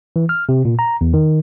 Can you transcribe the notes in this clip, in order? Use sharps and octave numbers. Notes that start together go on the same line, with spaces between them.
E3
F6
C3
A#2
A#5
E2
D#3